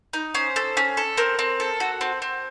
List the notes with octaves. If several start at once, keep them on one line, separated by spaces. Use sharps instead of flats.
D#4
C#4 C5
A4
C#4
A4
C4 A#4
C4
A4
F#4
C4
C4